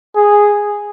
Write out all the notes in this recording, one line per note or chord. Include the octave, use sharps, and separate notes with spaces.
G#4